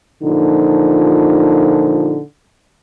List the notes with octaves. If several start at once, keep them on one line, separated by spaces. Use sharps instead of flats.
A#2 D3 F3 D#4